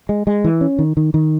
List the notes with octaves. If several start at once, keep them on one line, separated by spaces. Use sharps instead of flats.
G#3
G#3
E3
C#4
D#3
D#3
D#3